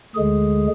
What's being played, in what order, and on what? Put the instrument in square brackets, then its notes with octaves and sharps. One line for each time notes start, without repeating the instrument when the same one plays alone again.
[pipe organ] D2 D3 G#3 G#4